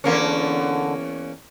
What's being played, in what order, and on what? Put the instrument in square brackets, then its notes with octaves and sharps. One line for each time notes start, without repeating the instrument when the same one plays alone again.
[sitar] E2 A#3 C#4 [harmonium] D3